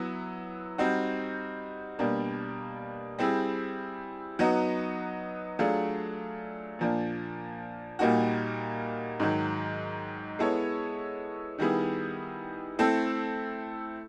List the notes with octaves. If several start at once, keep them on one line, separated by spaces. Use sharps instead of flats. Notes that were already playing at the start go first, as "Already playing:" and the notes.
Already playing: F#3 B3 E4
G3 C4 D#4 F#4
B2 G3 A#3 D4
G3 C4 E4 G#4
F#3 B3 D#4 F#4
F#3 A3 D4 F4 G#4
A#2 F3 A#3 D4
A#2 G3 A#3 D#4 F#4
G#2 D#3 F#3
G#3 B3 E4 A4 C#5
D#3 G3 B3 E4 G#4
A3 C4 E4 A4